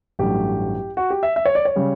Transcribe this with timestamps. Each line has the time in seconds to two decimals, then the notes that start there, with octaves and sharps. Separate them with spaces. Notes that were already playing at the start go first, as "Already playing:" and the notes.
0.19 A1 G2 F#3 A3 G4
0.97 F#4
1.10 G4
1.23 E5
1.36 E5
1.45 C#5
1.55 D5
1.65 C#5
1.76 C#3 G3